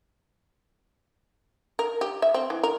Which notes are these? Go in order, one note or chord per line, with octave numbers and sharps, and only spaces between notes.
A#4
G4
E5
C4
E3
A#4